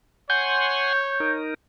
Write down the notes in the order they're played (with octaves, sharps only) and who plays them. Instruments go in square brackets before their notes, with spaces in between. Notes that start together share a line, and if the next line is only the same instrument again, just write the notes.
[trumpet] C#5 [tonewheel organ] F#5 G#5 C6 [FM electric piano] G6
[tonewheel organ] D#4 A#4